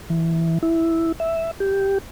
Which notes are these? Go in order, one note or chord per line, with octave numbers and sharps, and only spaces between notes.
E3
E4
E5
G4